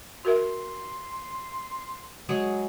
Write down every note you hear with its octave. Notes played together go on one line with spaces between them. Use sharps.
F#4 A#4 E5 C6
F#3 G#3 G#4